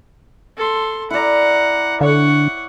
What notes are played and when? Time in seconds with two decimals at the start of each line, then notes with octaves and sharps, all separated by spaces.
0.57 A4 C6
1.10 E4 D5 F#5 A#5
2.01 D3 C#5 F#5